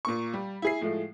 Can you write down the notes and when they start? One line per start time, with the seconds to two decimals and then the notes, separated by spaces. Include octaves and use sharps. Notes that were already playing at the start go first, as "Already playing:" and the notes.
0.05 A#2 A#3 C#6
0.34 G3
0.62 E4 G#4 C7
0.81 A2 F3 G#3 A3